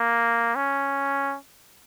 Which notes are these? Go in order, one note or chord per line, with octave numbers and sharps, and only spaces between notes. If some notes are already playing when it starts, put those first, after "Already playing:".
Already playing: A#3
C#4